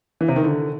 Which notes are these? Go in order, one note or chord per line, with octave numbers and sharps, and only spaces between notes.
E3
C3
D#3
D3